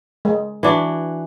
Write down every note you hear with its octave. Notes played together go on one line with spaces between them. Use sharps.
G#3
E3 D4 F#4